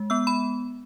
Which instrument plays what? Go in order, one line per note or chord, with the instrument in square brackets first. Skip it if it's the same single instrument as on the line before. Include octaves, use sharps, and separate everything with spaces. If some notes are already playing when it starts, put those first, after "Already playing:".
Already playing: [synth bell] G#3
B3 E6
B5